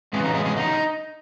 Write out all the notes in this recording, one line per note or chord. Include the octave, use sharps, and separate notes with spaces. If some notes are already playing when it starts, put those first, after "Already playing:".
E2 C#3 F#3 G#3 B3 G#4
D#4
G#3 G#4
G#3 G#4
D#4